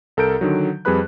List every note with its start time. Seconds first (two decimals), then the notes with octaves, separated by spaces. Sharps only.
0.17 C2 A4 A#4 A#5 G6 D7
0.41 D3 D#3 F#3
0.85 F2 G3 G#4 B4 B5 F#6